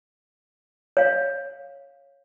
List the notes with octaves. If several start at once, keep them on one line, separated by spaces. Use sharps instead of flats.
C#5 F5